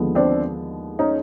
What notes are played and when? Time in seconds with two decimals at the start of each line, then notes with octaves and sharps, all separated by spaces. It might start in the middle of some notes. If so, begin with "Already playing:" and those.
Already playing: D#2 D3 F3 G#3 B3
0.15 C4 D4
0.99 C#4 D#4